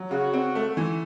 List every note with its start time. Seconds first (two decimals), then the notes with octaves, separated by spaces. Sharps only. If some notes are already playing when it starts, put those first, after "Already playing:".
Already playing: F#3
0.11 C#3 F#4
0.33 C4
0.55 A3
0.77 E3